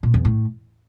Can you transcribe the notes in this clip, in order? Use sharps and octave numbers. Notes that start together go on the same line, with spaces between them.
A#2
E2
A2